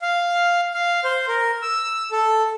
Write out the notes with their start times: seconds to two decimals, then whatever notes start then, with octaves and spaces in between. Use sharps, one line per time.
0.02 F5
0.74 F5
1.04 C5
1.28 A#4
1.62 E6
2.11 A4